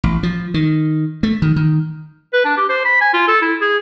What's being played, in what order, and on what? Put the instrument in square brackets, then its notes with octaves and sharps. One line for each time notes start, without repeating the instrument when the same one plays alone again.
[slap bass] A1
F3
D#3
A3
D#3
D#3
[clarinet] B4
D4
G4
C5
B5
G#5
F4
A4
E4
G#4